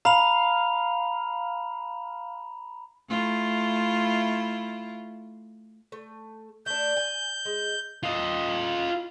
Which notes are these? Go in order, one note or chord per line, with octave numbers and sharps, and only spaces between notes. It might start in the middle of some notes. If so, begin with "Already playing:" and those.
F5 A#5 B5 F7
A3 E4 F4
A3
A3 D4 G6
G#5
G#3
F4 D#5